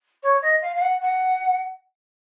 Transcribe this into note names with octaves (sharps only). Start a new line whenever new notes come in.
C#5
D#5
F5
F5
F#5
F#5